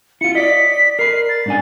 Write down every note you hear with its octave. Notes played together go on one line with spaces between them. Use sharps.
E4 F4 C#7
D5 D#5 B6
A#4 B5 C7
A6
G#2 D4 G#5